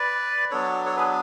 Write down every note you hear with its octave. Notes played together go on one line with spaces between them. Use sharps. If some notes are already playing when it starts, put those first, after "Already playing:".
Already playing: B4 D5
F#3 B3 D4 A4 C#5
A4 C#5
G#4 B4